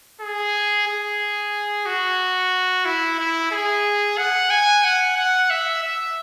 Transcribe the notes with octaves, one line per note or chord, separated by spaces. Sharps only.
G#4
G#4
F#4
E4
E4
G#4
F#5
G#5
F#5
F#5
E5
E5